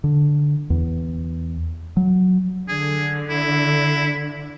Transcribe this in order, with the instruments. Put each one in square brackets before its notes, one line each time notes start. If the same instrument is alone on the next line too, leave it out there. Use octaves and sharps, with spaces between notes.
[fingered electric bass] D3
E2
F#3
[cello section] D3 [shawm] G#4
[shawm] E4